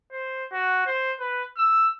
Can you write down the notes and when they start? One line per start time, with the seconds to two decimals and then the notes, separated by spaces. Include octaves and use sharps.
0.12 C5
0.52 F#4
0.87 C5
1.20 B4
1.57 E6